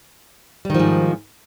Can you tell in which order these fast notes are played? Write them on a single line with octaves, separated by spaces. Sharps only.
G3 D#3 F3 G#2